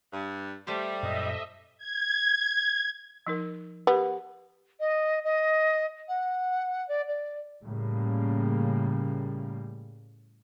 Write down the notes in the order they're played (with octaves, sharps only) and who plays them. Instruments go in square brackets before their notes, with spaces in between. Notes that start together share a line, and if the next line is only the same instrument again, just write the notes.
[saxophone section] G2
[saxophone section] G3 [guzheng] A3 G4 C5
[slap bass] F#2 A#2 [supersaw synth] D#5 E5
[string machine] G#6
[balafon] F3 D#4 A#4
[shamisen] B3 [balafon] G4 A#4
[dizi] D#5
D#5
F#5
D5
D5
[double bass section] A2 C#3 G3 A#3